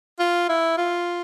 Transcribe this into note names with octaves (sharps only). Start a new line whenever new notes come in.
F4
E4
F4